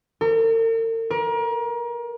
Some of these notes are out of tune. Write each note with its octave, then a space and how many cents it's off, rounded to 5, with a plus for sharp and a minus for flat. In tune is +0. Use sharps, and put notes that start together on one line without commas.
A#4 -45
A#4 +30